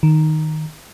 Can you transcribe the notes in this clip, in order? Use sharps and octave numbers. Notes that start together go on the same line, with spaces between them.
D#3